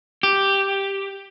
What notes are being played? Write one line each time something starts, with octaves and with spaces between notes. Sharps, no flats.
G4